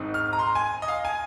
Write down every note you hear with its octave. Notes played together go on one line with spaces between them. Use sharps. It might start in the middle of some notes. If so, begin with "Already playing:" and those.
Already playing: G#1 G#2 G#3 C4 D#4
F6
A#5
C6
G#5
D#5
F5
G#5